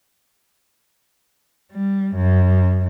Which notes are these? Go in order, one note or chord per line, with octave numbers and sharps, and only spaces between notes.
G3
F#2